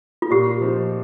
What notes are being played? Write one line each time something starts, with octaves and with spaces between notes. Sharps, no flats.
F4
A#2 G4
F3 C4 D#4